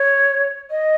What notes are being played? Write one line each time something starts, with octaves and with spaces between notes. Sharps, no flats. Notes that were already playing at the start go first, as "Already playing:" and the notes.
Already playing: C#5
D#5